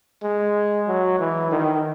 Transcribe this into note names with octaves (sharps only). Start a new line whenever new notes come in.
G#3
F#3
E3
D#3